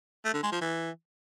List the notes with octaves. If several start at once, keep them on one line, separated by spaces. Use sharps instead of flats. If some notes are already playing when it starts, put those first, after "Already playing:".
A3
D3
G#3
F3
E3